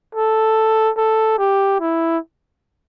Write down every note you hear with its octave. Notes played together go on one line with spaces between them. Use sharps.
A4
A4
G4
E4